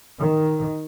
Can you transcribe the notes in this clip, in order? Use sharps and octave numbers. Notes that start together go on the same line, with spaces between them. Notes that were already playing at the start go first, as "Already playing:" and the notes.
D#3